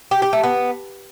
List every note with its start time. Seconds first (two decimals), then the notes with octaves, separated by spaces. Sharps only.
0.11 G4
0.22 G4
0.33 A3
0.43 B3